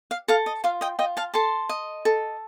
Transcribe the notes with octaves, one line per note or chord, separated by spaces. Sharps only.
F5
A4 F5
D#5
F4 F5
D#5 G5
F4 D#5 G5
F5 A5
A4 A5 C6
D#5
A4